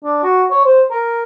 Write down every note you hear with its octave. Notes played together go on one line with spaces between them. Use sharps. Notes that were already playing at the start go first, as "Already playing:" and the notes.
D4
F#4
C#5
C5
A#4